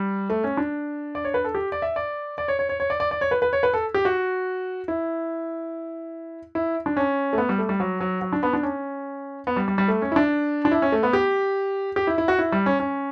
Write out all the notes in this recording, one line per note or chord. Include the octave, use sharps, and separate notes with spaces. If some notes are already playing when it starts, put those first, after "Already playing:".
Already playing: G3
A3
C#4
D4
D5
C#5
B4
A4
G4
D5
E5
D5
D5
C#5
C#5
C#5
C#5
D5
D5
D5
C#5
B4
B4
C#5
B4
A4
G4
F#4
E4
E4
D4
C#4
A3
B3
G3
A3
G3
F#3
F#3
F#3
D4
B3
D4
C#4
B3
G3
G3
G3
A3
C#4
E4
D4
D4
E4
C#4
A3
B3
G4
G4
E4
E4
F#4
E4
G3
C#4
C#4